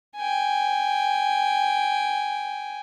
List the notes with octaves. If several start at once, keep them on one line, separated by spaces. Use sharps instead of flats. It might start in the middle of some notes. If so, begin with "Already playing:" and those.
G5 G#5